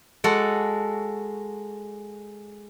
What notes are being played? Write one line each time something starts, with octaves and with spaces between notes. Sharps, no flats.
G#3 F#4 A4